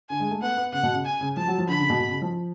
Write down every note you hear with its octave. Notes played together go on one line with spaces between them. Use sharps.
D3 G#5
G#3
A3
B3 F#5
B3
C#3 F#5
B2
C#3
G#5
C#3
F3 A5
F#3
F3
D3 B5
C#3
B2
B2
C#3
F3